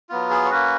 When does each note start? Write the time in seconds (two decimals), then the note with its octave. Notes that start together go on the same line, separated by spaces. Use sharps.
0.09 F#3 B3 F4
0.30 G#4
0.45 C#5
0.50 A#3 C#4 F#4 B4